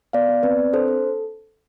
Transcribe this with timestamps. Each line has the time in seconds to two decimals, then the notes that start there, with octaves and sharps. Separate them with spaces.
0.13 B3 D5 F5
0.29 B3
0.43 C4 B4 D5
0.59 C4
0.73 D4 A4 C5
0.88 A4